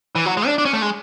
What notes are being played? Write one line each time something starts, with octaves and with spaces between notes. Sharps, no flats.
E3
F#3
G#3
D4
D4
C#4
A3
G#3